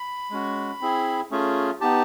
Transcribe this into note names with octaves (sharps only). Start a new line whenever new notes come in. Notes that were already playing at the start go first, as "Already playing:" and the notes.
Already playing: B5
G#3 C#4 F#4
C4 E4 G#4
A3 C#4 F4 G#4
B3 D#4 G4 A5